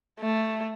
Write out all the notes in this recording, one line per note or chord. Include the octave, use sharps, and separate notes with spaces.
A3